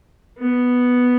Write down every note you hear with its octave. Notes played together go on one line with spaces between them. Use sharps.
B3